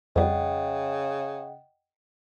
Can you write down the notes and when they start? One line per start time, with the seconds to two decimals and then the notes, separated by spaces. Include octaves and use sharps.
0.16 F2 C#3 G3 D#5 F#5 G5